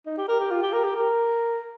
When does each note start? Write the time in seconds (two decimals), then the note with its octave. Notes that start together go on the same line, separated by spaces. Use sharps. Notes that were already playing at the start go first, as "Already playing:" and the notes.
0.06 D#4
0.18 G4
0.28 A#4
0.40 G4
0.51 F4
0.62 G4
0.73 A#4
0.84 G4
0.96 A#4